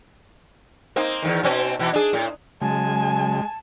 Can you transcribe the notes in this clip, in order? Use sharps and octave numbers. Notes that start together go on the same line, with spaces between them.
A#3 C4 D#4
E2 G#2 D#3
B2 C4 C#4
B2 E3 B3
D4 G#4
A2
C#3 F#3 G#3 G#5 A5